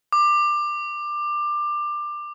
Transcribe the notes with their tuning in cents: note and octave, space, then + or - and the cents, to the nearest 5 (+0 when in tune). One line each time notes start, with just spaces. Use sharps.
D6 +20